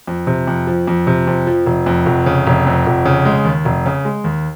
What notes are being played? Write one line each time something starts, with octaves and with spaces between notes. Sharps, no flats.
F2
C3
F2
F3
F2
C3
F2
F3
F1
F2
F1
C#3
F1
F2
F1
C#3
G#3
D#2
F1
C#3
G#3
D#2